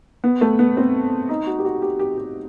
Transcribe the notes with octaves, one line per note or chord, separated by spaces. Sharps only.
B3
A3
B3
C4
D#4
F#4
G4
F#4
G4
G4
G4